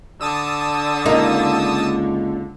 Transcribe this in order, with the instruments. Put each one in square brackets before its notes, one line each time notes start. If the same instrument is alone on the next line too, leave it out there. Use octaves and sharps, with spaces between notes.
[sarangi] D3 [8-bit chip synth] A5 D#6 E6
[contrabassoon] C#2 [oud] A#3 D#4